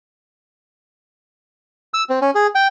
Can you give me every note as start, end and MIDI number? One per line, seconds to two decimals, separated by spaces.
1.94 2.04 88
2.10 2.19 60
2.22 2.30 61
2.35 2.47 68
2.55 2.68 79